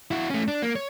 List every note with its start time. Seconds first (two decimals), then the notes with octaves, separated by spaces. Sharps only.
0.11 E4 F#4
0.30 A3 C#4
0.48 D4
0.62 A#3
0.76 C#5